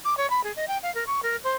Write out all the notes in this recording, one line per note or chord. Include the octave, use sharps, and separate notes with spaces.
D6
C#5
B5
G#4
D#5
G5
F5
A#4
C#6
A#4
C5